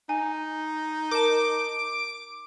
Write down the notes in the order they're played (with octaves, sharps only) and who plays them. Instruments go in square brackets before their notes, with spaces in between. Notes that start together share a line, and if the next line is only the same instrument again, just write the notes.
[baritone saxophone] D#4 [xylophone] G#5
[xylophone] A#4 A5 [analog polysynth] D6